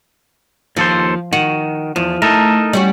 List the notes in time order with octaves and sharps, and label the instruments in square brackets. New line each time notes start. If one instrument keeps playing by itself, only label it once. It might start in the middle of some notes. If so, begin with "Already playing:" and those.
[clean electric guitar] D#2 A4 C5 [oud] F3
[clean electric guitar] D#3 [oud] F#4
[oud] E2 [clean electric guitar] F3
[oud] A3 [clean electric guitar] D#4 A4 A#4
[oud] G3 C#4 F#4